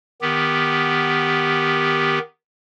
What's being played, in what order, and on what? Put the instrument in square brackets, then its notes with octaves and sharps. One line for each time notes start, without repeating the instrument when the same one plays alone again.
[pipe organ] D#3 B3 G4